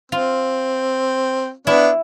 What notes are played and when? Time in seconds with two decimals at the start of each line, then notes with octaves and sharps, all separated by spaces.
0.12 C4 F4
1.67 B3 D4 E4